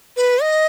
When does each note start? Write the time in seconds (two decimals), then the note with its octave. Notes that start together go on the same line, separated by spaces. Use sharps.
0.17 B4
0.42 D#5